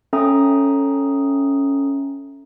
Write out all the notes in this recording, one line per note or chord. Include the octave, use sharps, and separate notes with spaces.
C#4 A4 E5 G5 A#5 D#6